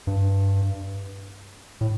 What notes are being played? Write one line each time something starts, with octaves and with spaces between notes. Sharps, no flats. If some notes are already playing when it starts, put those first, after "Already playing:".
G2
A2